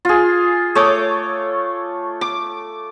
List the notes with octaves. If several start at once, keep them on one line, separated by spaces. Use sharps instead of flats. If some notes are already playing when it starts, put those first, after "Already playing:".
F4 G#4
A3 C#5 D6 D#6
D6